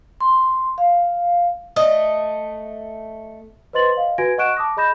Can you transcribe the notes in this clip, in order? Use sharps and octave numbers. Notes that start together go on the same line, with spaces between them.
C6
F5
A3 D#5
B4 C5 D#5 C6 A6 F#7
D#5 F5
F#4 B4 G#5 G#6 A#6 D7
D#5 F#5 C#6 F#6 D7 E7
A5 D6 D#6 A#6
G#4 D#5 B5 G6 A#6 E7